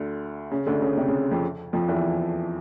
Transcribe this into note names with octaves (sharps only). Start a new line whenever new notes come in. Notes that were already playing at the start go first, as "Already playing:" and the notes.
Already playing: D2 D3
C#3
D2 D3
C#3
C3
C#3
F2 F3
F2 F3
E2 E3